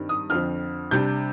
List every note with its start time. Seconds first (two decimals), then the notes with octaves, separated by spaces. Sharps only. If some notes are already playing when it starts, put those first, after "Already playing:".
Already playing: G2 D#3 G3 C4
0.09 D#6
0.30 F2 D3 F3 C4 F6
0.91 C3 G3 D4 G6